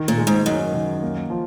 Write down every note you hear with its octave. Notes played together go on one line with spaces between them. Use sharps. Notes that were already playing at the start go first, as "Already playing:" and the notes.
Already playing: D#3
A#2
G#3
G#2
F#2 D#4
D#3
A#3
F3